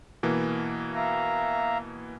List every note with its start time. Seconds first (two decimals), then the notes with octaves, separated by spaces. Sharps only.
0.23 B2 E3 A#3
0.94 E5 F5 A#5